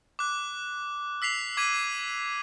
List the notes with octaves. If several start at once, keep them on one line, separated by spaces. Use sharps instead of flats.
D6 F#6
E6 B6 C7 F7
D6 G#6 B6 D#7